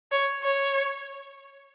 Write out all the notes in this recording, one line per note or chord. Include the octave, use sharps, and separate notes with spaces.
C#5
C#5